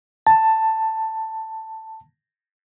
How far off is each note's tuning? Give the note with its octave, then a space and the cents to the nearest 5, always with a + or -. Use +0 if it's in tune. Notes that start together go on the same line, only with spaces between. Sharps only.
A5 +10